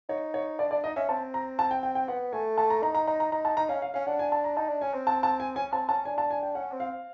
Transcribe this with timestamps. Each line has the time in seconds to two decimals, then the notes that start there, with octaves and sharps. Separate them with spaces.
0.09 D#4 C#5
0.34 C#5
0.59 D4 D5
0.71 D4 D5
0.84 D#4 D#5
0.96 C#4 E5
1.09 C4 A5
1.34 A#5
1.59 A5
1.71 G5
1.83 G5
1.95 G5
2.08 B3 F#5
2.33 A3 G#5
2.58 A3 A5
2.70 A#5
2.82 D#4 A#5
2.95 A#5
3.07 D#4 A#5
3.20 A#5
3.32 D#4 A#5
3.45 A5
3.57 D#4 A#5
3.69 C#4 F5
3.82 F5
3.94 C#4 F5
4.07 D4 F#5
4.19 G#5
4.32 A5
4.44 A#5
4.57 D#4 A5
4.69 D4
4.81 C#4 G#5
4.94 C4
5.07 A5
5.23 A5
5.40 G#5
5.56 C#4 G#5
5.72 C4 A5
5.89 C#4 A5
6.05 D4 G#5
6.18 A5
6.31 G#5
6.43 G5
6.55 C#4 F#5
6.72 C4
6.80 F5